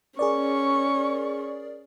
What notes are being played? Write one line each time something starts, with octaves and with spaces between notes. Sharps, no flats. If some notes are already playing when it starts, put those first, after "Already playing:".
C#4 G#4 A#4 D5 C#6